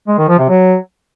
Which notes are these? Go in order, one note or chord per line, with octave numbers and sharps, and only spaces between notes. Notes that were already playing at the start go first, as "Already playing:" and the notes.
G#3
D#3
F3
C3
F#3